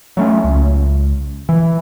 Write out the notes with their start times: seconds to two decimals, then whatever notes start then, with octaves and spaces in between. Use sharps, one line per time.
0.17 F#3 A3 C#4
0.44 C#2
1.49 E3